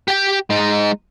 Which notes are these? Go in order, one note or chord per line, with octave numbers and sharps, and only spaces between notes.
G4 G5
G#3 D#4